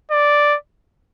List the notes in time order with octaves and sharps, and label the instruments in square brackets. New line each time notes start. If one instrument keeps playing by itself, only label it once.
[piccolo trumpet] D5